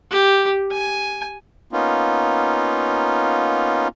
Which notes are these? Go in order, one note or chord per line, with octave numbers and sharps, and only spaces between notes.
G4
G#5
A#3 B3 C#4 D#4 F4